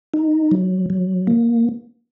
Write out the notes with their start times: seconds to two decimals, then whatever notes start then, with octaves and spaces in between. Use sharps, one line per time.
0.14 D#4
0.51 F#3
0.90 F#3
1.27 A#3